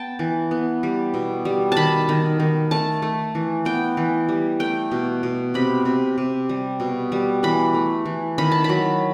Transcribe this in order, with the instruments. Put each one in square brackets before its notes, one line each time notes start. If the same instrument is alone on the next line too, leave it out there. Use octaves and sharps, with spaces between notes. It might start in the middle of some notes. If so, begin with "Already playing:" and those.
Already playing: [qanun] B3 G5 A5
E3
B3
G3
B2
G3
D#3 A5 B5
D#3
D#3
A3 A5
A3
E3
B3 G5
E3
G3
A3 G5
B2
B2
C3 B5
C3
C3
G3
B2
G3
E3 B5
A3
E3
D#3 B5
A5
F#3 B5